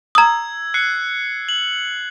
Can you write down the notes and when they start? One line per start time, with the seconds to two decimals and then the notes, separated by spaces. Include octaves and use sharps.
0.15 A#5 D#6 E6 G#6
0.74 F#6 C7 C#7
1.49 F#7